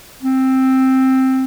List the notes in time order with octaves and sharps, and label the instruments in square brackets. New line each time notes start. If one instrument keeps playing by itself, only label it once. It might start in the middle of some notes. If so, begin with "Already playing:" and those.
[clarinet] C4